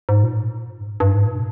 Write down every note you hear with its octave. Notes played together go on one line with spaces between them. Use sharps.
G#2
A#2
G2
G#2
G2
G#2
A#2
B2